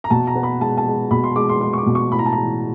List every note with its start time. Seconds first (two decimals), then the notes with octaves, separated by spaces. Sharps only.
0.04 A#5
0.10 B2 A5
0.27 A#5
0.35 B3
0.43 B5
0.60 G#3 A5
0.78 A5
0.86 G#3
1.11 B2 B5
1.24 C6
1.36 G#3 D6
1.49 C6
1.61 G#3 C6
1.73 C#6
1.78 D6
1.86 B2
1.95 C#6
2.12 A2 B5
2.19 A#5
2.26 A5
2.33 E3 A#5